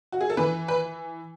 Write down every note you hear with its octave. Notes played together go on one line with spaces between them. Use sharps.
F#4
G#4
A4
E3 B4
B4